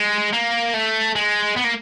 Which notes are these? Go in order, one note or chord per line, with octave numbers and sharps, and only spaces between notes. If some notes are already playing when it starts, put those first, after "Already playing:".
Already playing: G#3
A#3
A3
G#3
B3
A#3